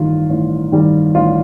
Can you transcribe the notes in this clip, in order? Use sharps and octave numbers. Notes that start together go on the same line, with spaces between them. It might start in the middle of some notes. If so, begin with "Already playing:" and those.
Already playing: A1 G2 D#3 G3 F4
A1
G2 D#3 G3
A1 F4